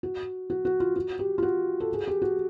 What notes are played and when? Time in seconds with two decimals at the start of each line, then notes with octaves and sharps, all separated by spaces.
0.03 F#4
0.50 F#4
0.65 F#4
0.80 F4
0.96 F#4
1.19 G4
1.38 F4
1.42 F#4
1.80 A4
1.94 G#4
2.07 G4
2.22 F#4